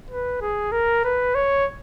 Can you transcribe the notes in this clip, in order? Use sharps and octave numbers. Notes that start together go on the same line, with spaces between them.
B4
G#4
A#4
B4
C#5